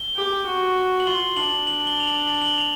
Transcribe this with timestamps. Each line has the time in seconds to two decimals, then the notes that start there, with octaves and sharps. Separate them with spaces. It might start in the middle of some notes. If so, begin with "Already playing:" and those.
Already playing: G7
0.16 G4
0.46 F#4
1.00 F#7
1.07 F4 G7
1.36 D4 F#7
1.67 F#7
1.87 G7
2.00 F7
2.07 F#7
2.28 F#7
2.34 G7
2.42 F#7
2.58 F7